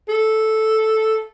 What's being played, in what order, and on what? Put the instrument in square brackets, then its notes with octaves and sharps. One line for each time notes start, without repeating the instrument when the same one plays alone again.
[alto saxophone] A4